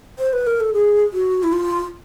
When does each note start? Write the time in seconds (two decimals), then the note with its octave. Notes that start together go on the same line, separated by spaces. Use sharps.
0.19 C5
0.33 B4
0.47 A#4
0.60 A4
0.74 G#4
1.13 F#4
1.43 E4
1.52 F4